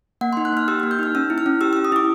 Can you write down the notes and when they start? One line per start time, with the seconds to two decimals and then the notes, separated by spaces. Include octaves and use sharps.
0.21 A#3 F#5
0.33 D#4 C6
0.45 F#6
0.53 A#3 F6
0.68 G4 E6
0.80 A#3 F6
0.91 G6
0.99 D#4 F6
1.15 C#4 E6
1.30 E4
1.38 F6
1.46 C#4
1.61 G4 E6
1.73 C#4 E6
1.85 D#6
1.92 E4 D6